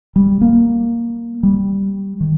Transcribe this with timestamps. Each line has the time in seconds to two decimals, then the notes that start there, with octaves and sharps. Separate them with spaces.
0.16 G3
0.41 A#3
1.43 G3
2.20 D#3